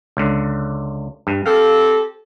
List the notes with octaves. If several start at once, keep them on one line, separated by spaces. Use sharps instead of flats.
C#2 D3
G2
C4 G4 A4 F5